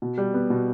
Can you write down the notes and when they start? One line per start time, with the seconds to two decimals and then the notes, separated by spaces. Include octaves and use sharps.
0.02 B2
0.18 G3
0.34 B3
0.50 B2